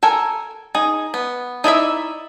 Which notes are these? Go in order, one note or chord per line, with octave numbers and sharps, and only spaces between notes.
A4 A#4 G#5
D#4 G#4
B3
D#4 E4 D5 E5